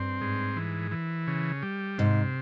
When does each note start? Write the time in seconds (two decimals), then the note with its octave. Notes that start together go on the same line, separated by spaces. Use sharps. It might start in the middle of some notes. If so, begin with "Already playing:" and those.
Already playing: G2 C4
0.21 G#2
0.56 E3
0.91 E3
1.27 C#3
1.63 G3
1.98 G#2 C3